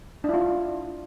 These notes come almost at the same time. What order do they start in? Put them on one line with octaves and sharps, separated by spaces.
D4 E4 F4